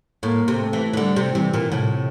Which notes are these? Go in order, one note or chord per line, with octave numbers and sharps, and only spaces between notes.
A2 A#3
C3
A3
E3
E3
D3 G3
C3
C3 E3
A#2
A2 C3